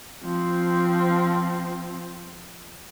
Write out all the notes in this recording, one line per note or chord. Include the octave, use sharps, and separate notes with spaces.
F3 C4